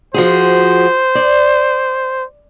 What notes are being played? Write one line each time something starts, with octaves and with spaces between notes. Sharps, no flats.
F3 F#4 G#4 C5
D5